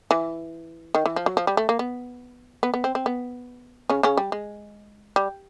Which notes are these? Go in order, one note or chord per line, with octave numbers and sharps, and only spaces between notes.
E3
D#3
E3
F3
F#3
F3
G3
A3
A#3
B3
B3
B3
C4
C4
B3
C#3 C#4
C#3 C#4
G3
G#3
G3